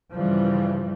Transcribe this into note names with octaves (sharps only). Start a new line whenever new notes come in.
G2 C#3 E3 F3 G3